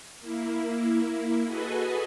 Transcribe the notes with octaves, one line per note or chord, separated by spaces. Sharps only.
A#3 E4
F#4 G#4 A4 B4 D#5 G#5